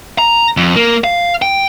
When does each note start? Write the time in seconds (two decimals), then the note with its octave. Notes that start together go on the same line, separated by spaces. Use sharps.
0.18 A#5
0.57 F2
0.76 A#3
1.04 F5
1.42 G5